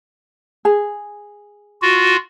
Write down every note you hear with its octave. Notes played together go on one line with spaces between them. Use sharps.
G#4
F4 F#4